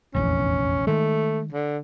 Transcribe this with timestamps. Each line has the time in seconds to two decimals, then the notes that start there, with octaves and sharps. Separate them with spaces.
0.14 F1 A#1 E2 C#4
0.87 D#3 G#3 A3
1.53 D3